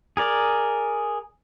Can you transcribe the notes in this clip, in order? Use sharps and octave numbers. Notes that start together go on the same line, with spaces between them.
G#4 A#4 D5